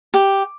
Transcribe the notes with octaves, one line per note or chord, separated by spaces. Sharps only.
G4